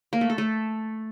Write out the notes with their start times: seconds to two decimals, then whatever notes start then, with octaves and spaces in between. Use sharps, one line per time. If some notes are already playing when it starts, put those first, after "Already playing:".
0.13 A#3
0.21 A3
0.30 A4
0.38 A3